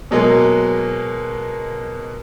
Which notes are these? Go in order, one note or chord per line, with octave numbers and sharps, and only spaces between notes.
B2 F#3 G#3 A#3